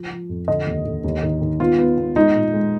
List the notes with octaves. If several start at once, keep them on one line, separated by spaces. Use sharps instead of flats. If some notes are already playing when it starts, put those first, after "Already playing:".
Already playing: F3
F3
F2
D3 D#5
D#2
D3
D#2
D#3
D#3
B3 F4
B3
B3
G#3 D#4
A#2
G#3